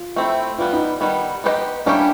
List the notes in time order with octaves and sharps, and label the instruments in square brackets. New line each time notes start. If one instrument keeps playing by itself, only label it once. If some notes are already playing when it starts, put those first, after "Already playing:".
Already playing: [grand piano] F4
[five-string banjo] A3 C4 E4
[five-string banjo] E3 G3 B3 [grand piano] F4
[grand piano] D#4
[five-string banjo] D#3 G3 B3
B3 D#4 G4 C5 D#5
[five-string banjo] G3 A#3 C#4 E4 G4 [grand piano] D4